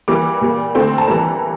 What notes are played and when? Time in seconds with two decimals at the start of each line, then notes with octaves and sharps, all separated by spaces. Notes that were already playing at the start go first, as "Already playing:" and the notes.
0.08 E3 G3 A#3 D6
0.41 A#2 G3 A#3
0.75 D3 A3 C4
0.98 A5
1.08 E3 G3 A#3 A#5